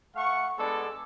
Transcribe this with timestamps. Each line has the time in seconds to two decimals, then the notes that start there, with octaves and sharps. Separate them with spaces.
0.16 A3 F5 F#5 C#6
0.58 G#3 B3 D4 A4 D5